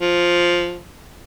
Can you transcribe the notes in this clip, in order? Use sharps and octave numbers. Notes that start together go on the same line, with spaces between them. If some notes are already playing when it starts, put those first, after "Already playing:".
F3